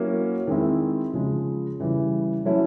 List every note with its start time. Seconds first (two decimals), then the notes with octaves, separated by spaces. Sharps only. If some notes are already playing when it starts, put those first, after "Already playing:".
Already playing: F#3 A#3 C#4 E4
0.47 D#3 G#3 C4 E4
1.13 C#3 F3 G#3
1.80 C#3 E3 G3
2.45 F#3 A3 C#4 E4